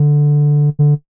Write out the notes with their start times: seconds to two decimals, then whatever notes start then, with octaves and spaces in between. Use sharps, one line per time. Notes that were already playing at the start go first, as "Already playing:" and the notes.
Already playing: D3
0.79 D3